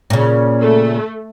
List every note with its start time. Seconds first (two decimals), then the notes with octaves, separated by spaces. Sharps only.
0.10 A#2 C#3
0.62 A3